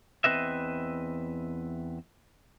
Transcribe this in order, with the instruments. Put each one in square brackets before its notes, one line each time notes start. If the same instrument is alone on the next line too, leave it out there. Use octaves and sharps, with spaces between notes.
[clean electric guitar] E2 G#3 C4 B4 D#5 E5